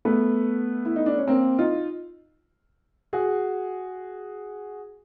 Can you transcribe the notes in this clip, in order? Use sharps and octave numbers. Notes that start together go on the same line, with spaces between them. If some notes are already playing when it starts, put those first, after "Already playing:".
A3 B3
E4
D#4
D4
C#4
A#3 C4
D#4 F4
F#4 G#4